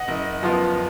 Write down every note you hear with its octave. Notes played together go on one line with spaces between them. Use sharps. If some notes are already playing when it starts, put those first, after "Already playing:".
Already playing: D#5 F#5
F#1
F#2 F3 B3 F4